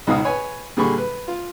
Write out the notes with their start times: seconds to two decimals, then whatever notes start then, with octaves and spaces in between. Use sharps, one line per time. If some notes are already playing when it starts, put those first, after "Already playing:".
0.07 C#2 G#2 B2 G#4 F5 D#6
0.25 B4 C#5 G#5
0.77 A#2 D3 G3 G#4 B5 C#6
0.98 B4
1.28 F4